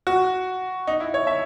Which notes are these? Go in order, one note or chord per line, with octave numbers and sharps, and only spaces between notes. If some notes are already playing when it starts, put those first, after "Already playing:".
F#4
D#4
E4
C#5
E5